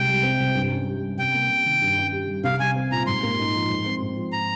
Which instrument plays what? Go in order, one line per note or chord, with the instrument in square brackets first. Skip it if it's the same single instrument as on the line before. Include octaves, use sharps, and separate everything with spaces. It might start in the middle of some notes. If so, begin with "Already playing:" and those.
Already playing: [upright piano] C2 G#3 [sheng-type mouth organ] G5
[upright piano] G3
C4
C3
G2
C#4
G4
G3
[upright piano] C3 [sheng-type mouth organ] G5
[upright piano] A#3
C3
D#3
G2
C#4
G4
G3
[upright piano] C2 [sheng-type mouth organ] F5
[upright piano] G3 [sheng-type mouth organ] G#5
[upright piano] C4
[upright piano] A#2 [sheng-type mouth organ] A#5
[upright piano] G#2 [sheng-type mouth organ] C6
[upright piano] A#3
D#4
F3
G#2
C4
G#2
F3
[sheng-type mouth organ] A#5